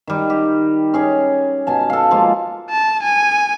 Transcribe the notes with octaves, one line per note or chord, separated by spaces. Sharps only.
D#3 G3
G4
C#4 G#4 C#5
B2 G#5 A5
A4 F5
F3 G#3 A#3 F4
A5
G#5